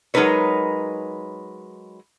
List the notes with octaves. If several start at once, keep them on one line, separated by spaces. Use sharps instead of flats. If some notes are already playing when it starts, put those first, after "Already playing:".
F#3 G#3 D#4 A#4 B4 C#5